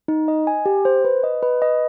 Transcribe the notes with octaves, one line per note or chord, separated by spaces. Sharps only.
D#4
D#5
G#5
G4
C5
B4
D#5
B4
D#5